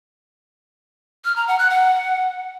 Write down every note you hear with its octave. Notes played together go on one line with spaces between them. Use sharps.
F6
A#5
F#5
F#6
F#5